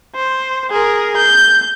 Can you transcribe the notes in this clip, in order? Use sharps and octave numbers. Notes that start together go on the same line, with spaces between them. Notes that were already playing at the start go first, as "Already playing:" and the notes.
C5
G#4 A#4
G6